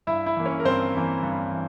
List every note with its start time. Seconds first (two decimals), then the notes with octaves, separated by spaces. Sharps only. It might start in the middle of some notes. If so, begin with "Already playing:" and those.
0.07 G2 E4 E5
0.26 E4 E5
0.36 E3 A#3
0.46 C#4 C#5
0.60 A#4
0.65 G2 C4 C5
0.94 E3 A#3
1.23 G2
1.51 E3